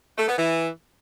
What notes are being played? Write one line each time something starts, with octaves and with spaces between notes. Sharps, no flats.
A3
B3
E3